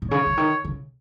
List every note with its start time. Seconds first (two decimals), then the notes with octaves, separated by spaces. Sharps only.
0.02 A#2
0.10 C#3 C#5
0.26 C#3
0.37 D#3
0.65 C#3